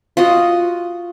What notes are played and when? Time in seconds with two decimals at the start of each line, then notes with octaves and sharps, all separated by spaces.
0.17 F4 F#4 D#5